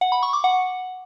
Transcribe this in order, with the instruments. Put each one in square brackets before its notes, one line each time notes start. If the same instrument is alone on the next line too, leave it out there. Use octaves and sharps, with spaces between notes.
[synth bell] F#5
B5
C#6
D6
F#5